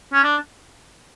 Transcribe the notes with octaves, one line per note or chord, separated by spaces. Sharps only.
C#4
D4